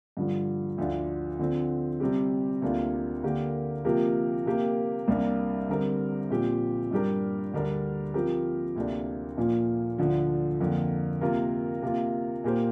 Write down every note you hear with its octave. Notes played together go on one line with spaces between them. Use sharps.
G2 D3 F3
D2 D3 F3 D4 F4
D3 F3 C4
C3 G3 C4 G4
D2 C3 A#3 D4 F4
D3 A#3 G4 A#4
C3 F3 A#3 G4 A#4
C3 A#3 G4 A#4
C2 C3 G3 A#3 D4
D3 G3 C4 A#4
A#2 F3 C4 G4
G2 G3 D4 G4 A#4
D2 D3 G3 D4 A#4
F3 C4 G4 A#4
D2 C3 A#3 D4
A#2 F3 A#3
D2 D3 F3
F2 D3 A#3
C3 A#3 F4 A#4
C3 A#3 F4
A#2 A#3 G4 C5